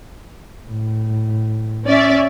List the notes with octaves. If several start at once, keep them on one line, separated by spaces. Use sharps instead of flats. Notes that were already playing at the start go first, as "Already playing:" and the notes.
A2
C#4 D5 E5